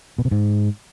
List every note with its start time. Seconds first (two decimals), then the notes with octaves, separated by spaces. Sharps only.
0.18 B2
0.25 C3
0.31 G#2